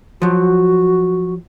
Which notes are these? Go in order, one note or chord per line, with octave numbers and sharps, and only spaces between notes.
F3 F#3 F#4